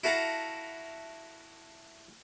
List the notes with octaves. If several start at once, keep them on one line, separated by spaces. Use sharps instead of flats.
E4 F#4 A4 F5 A5 A#5